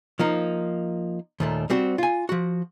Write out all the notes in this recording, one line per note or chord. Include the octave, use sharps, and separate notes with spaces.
F3 A#3 D#4
D#2 A#2 A3
G3 C4 F#4
F4 G#5
F3 F#4